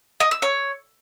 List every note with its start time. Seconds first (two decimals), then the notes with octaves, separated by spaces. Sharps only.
0.20 D#5
0.31 E6
0.42 C#5